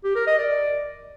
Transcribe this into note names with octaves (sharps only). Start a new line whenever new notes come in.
G4
A#4
D#5
D5